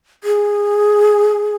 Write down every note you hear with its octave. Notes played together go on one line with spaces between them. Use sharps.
G#4